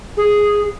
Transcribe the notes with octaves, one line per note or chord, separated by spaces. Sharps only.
G#4